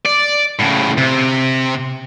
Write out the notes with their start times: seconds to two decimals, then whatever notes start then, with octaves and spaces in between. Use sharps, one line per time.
0.05 D5
0.60 A2 C#3
0.98 C3